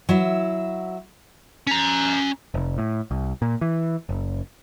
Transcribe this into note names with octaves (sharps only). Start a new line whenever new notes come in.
F#3 E4 E5
C#4 A#5
F1
A2
C2
A#2
E3
F#1